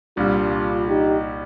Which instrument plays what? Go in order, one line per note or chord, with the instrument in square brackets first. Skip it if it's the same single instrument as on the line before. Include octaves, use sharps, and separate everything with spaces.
[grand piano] C2 A#2 G3 [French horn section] D4 F4
[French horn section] D#4 G4